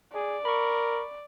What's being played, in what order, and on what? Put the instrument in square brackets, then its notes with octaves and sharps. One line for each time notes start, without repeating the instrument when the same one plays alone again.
[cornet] G#4 [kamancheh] D5
[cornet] A#4 [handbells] B5 C#6